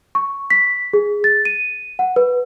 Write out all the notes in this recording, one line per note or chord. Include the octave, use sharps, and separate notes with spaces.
C#6
B6
G#4
A6
D#7
F#5
B4